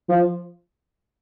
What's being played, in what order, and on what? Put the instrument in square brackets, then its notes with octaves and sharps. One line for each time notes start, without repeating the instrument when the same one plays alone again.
[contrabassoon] F3